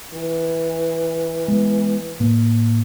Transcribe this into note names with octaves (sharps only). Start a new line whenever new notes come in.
E3
G#3 B3
A2 A#3